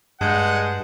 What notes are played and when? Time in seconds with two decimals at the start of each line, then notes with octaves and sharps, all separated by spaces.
0.21 G2 G#3 F#5 A5 G6